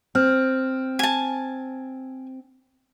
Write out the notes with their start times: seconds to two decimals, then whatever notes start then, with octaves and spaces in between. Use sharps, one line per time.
0.15 C4 C5 F6
0.99 G#5 A5